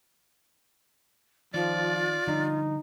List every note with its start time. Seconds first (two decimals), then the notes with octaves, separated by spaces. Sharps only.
1.54 D#3 F3 F4 D5
2.27 D3 F3 G3 D#4